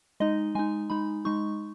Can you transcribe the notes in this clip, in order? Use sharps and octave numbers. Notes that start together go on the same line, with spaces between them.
G#3 D#4 D#5
G#3 D#4 G#5
G#3 D#4 B5
G#3 D#4 C#6